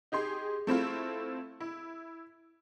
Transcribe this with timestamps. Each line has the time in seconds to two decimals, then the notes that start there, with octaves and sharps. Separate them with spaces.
0.12 D#4 G4 G#4 C6
0.67 A3 C4 E4 F4
1.60 E4